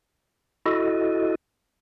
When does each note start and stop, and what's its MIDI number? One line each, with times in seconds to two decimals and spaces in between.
0.66 1.35 64
0.66 1.35 66
0.66 1.35 69
0.66 1.35 75